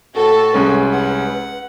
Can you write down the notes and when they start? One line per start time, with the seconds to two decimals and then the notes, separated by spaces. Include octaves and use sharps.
0.15 A2 F#4 A4
0.54 C2 G#3 C#4 B4
0.92 F#5